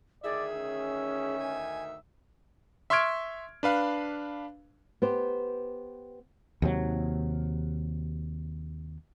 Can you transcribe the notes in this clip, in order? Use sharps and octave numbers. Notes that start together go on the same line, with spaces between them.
D2 D#3 G#4 D5 E5
C#4
G#5
E5 C6 C#6 F6 G#6 D7
D4 B4 F5 B5
B3 G4 C5
D#2 C3 F#3